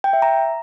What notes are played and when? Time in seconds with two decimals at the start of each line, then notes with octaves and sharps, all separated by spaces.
0.04 G5
0.13 E5
0.22 A#5